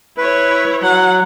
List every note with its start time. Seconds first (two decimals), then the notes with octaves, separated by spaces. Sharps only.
0.18 E4 B4 C#5
0.83 F#3 F#5